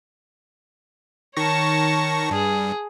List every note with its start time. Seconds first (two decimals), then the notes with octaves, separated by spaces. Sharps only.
1.37 D#3 C#5 A5 C#6 A#6
2.31 G2 G#4